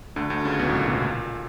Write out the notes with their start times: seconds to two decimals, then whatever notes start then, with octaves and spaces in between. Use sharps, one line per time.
0.16 D2 D3
0.30 D2 D3
0.45 C#2 C#3
0.59 B1 B2
0.67 A2
0.74 A#2
0.88 B1 B2
1.02 A#2